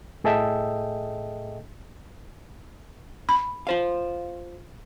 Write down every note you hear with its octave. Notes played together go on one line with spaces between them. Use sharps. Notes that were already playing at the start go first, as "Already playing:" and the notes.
A2 G#4 A4 D#5 E5 G5
B5
F4 C5 F5